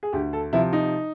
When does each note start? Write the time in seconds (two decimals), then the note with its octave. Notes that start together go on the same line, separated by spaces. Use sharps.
0.03 G#4
0.13 D2 G4
0.33 A4
0.53 C3 F3 E4
0.73 D#4